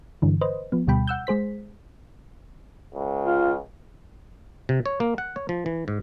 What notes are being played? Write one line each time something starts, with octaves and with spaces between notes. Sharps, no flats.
G2 D3 E3
B4 C5 D#5
F3 B3
D2 B2 G3 G5 B5
F#5 E6 G6
G#3 G#4 C5 B6
C#2
F4
C3
C#5
A#3
F#5
C#5
F3
E3
G#2